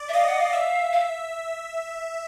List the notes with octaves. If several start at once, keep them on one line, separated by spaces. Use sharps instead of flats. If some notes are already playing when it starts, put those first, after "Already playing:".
Already playing: D5
E5
D#5 F5
F#5
F5
E5
F5